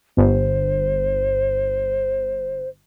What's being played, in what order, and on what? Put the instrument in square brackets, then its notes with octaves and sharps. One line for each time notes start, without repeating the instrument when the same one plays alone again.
[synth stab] G1 [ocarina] C5